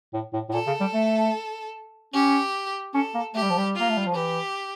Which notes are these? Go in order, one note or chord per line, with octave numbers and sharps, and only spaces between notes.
A2
A2
A2
A#2 A4
C#3
G3
A3
C#4 G4
C#4 A4
A#3
A3 G4
G3
F3
G3
A#3 F4
A3
G3
F3
E3 G4